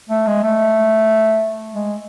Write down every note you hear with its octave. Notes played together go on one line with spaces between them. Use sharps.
A3
G#3
A3
G#3